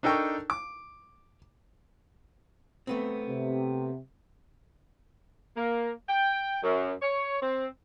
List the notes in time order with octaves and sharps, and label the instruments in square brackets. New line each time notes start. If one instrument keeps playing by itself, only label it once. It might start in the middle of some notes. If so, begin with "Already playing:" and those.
[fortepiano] D4 D#4 A4 A#4 G5 C#6
D6
[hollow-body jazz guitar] A3 B3 C4
[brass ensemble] C3
[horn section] A#3
G5
F#2
C#5
C4